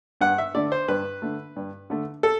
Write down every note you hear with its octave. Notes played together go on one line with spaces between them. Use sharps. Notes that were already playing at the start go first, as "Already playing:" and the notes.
G2 F#5
E5
D3 A3 D5
C5
G2 B4
D3 A3
G2
D3 A3
A4